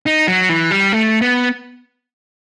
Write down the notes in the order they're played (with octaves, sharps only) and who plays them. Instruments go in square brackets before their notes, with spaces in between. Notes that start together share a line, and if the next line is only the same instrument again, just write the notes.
[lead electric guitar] D#4
F#3
E3
G3
A3
B3